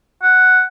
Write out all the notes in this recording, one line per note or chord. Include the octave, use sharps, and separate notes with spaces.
F#5